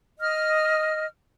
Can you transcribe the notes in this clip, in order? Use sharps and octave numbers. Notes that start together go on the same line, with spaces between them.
D#5 F6